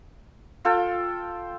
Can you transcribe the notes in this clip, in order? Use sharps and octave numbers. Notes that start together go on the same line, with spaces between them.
F4 A4 G5